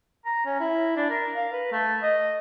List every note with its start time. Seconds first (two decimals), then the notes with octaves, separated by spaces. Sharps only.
0.25 A#5
0.45 C#4
0.60 E4
0.96 D4
1.10 A#4
1.35 F5
1.52 B4
1.72 A3
2.03 D#5